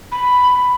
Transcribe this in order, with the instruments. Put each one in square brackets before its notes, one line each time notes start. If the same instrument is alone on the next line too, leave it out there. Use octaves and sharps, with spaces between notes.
[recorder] B5